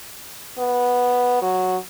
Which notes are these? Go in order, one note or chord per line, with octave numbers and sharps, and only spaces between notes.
B3
F#3